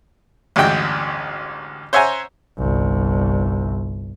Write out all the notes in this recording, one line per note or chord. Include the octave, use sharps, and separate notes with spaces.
A1 D2 G2 G#3 F#4 G5
C5 C#5 E5 F#5 G#5 A#5
G1 C2